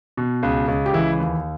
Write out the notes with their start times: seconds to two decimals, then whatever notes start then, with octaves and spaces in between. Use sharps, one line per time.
0.17 B2
0.43 C#2
0.68 C#2
0.86 G4
0.94 E3 E4
1.20 D#2